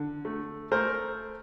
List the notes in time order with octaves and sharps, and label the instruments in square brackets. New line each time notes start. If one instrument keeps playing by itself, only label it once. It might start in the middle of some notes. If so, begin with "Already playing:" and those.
Already playing: [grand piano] D3
A3
A3 A#4 C5